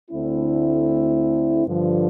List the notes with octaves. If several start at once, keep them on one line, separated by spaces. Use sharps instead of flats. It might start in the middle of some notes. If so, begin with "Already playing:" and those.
D2 D3 A3 C4 E4
G2 D3 F3